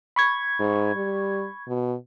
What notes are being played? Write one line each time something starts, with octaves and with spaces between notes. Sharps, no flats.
B5 C#6 G#6
G#2
G3
B2